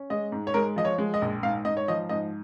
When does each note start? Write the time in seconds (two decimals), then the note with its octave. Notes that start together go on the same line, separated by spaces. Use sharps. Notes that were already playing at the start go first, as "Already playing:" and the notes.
Already playing: C#4
0.10 G#3 D#5
0.32 G#2
0.47 C#5
0.54 G#3 A#4
0.76 F3 D#5
0.85 C#5
0.98 G#3
1.14 D#5
1.22 A#1
1.43 G#2 F5
1.65 G#2 D#5
1.77 C#5
1.88 F3 D#5
2.09 G#2 D#5